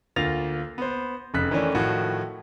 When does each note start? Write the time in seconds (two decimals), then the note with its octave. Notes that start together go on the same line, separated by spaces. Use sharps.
0.16 D2 A#3 F4 A6 A#6 F7
0.78 B3 C5
1.34 F1 C#3 F#6 B6
1.51 D#3 E3 A3 C#4 D4
1.75 A2 D#3 F3 F#4